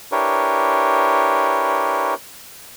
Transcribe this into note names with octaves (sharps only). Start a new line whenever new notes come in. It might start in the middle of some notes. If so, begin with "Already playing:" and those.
D4 E4 G4 A#4 B4 C#5